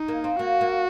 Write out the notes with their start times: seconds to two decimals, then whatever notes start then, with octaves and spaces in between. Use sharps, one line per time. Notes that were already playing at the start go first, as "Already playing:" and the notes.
Already playing: D#4
0.08 A#3
0.24 C4
0.39 A#3 F#4
0.61 A#3